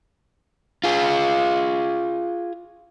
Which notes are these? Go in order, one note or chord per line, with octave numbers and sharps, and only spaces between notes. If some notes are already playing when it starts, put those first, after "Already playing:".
F4 G#4